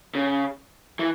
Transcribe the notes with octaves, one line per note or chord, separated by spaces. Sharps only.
C#3
E3